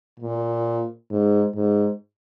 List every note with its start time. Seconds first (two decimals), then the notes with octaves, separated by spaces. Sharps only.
0.20 A#2
1.10 G#2
1.55 G#2